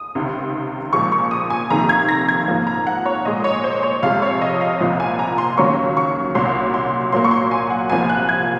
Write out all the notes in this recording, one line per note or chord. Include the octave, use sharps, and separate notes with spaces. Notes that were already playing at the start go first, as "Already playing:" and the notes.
Already playing: D#6
C#2 C3 D#3
A#2 F3 G#3 C#6
C#6
D#6
G#5
F2 C3 D#3 A#3 A#5
G#6
A#6
G#6
G#2 F3 A#3
A#5
F#5
C#5
A#2 G#3 D#5
C#5
C5
C#5
F2 C3 F3 G#3 F5
C#5
D#5
F5
C2 A#2 F3
G#5
A#5
C6
D#2 C#3 F#3 A#3 C#6
C#6
C2 A#2 F#3 C6
C6
A#2 F#3 A#3 C6
C#6
C6
G#5
F#5
C2 C3 F3 A#3 G#5
F#6
G#6